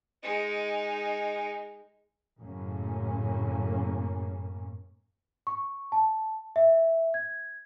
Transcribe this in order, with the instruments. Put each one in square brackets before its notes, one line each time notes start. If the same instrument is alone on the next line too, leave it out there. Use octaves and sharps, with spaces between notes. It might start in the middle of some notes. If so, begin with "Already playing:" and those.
[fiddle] G#3 D#4
[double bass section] F#2 A2 C#3 A#3 C#4
[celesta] C#6
A5
E5
G#6